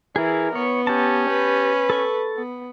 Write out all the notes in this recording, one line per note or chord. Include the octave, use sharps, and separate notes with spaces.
E3 E4 G#4 A#4
B3 C#5
C#4 G4 A5
B4
A4 C#6
B3